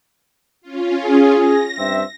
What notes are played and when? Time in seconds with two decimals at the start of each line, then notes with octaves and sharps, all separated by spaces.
0.61 C#4 F4
1.03 G#4
1.37 A#6
1.78 G2 C4 E5